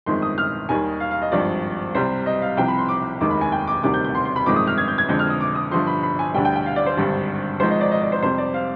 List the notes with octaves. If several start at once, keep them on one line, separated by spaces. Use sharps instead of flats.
G1 F2 D#3 G#3 C6
D#6
F6
D#2 D#3 G3 G#5
F5
F5
D#5
G#1 G2 F3 D5
C2 C3 G3 C5
D#5
F5
C2 C3 F3 G5
B5
C6
D6
F1 D#2 D#3 G#3 D6
B5
G#5
G5
D6
D2 C3 D#3 G3 D6
G6
G6
C6
C6
B5
G1 F2 D#3 G#3 D6
D#6
F6
G#6
G6
G#6
F2 D3 G#3 G6
F6
D#6
D6
D#6
G1 G2 D3 F3 C6
B5
B5
G#5
D2 D3 G3 G5
G5
G5
F5
D5
C5
G#1 G2 D3 G3
G#1 G#2 F3 G#3 C5
D#5
D5
D#5
D5
C5
F2 C3 G3 C5
D5
F5